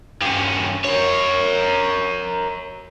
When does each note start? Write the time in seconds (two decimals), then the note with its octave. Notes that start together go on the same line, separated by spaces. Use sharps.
0.21 G2 C#4
0.84 A#4 C#5